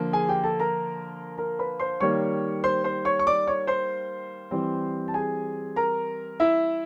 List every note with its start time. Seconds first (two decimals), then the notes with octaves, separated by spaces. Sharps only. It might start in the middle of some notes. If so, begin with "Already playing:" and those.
Already playing: D3 F3 A#3
0.13 G#4 G#5
0.29 G4 G5
0.44 A4 A5
0.60 A#4 A#5
1.38 A#4 A#5
1.59 B4 B5
1.80 C5 C6
2.00 D#3 G3 A#3 C#5 C#6
2.64 C5 C6
2.84 C5 C6
3.05 C#5 C#6
3.19 C#6
3.27 D5 D6
3.47 C#5 C#6
3.67 C5 C6
4.51 E3 G3 C4
5.08 A5
5.14 G#4 G#5
5.76 A#4 A#5
6.40 E4 E5